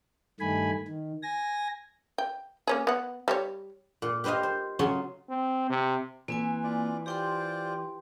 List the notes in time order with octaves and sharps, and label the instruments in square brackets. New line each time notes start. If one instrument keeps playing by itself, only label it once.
[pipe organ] G2 D#3 A3 G#5 B5
D#3
G#5 A#6
[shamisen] G5
A#3 C#4 G#4
B3 F#5
G3 C5 C#5
[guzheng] A#2
G4 B4 C5 D#5 F5
C5
C#3 F#3 C#4 F4
[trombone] C4
C3
[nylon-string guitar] E3 [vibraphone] A#3 C4 G#5
[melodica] F4 D5
[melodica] F4 C5 D5 [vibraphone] G4 G5 C6